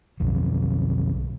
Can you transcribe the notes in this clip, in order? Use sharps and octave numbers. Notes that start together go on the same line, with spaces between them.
B1 F2